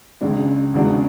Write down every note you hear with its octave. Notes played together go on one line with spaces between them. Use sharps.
C#2 C#3 G#3 D4
E2 C#3 G#3 D4 F#4